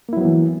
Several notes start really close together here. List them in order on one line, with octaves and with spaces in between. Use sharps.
A#3 E4 F#3 B3 E3